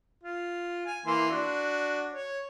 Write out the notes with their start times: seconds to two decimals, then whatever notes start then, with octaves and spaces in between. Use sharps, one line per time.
0.23 F4
0.86 G#5
1.06 E3 A#3 C6
1.31 D4 F#4
2.14 C#5